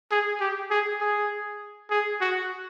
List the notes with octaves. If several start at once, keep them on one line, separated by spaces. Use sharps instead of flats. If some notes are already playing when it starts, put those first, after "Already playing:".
G#4
G4
G#4
G#4
G#4
F#4